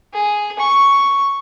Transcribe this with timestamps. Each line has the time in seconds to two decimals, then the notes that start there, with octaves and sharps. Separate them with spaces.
0.13 G#4
0.59 C#6